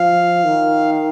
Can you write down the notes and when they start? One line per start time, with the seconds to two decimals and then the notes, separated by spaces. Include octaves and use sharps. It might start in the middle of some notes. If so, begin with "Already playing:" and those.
Already playing: F3 F5
0.44 D#3